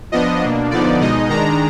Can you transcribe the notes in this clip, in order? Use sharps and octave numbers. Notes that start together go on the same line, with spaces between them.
F3 B3 D4 D#5
B2 A#3 D4
D3 F3 B3 D#4 D5
B2 G#3 D#4 D#5
D#3 G#3 D4 A#5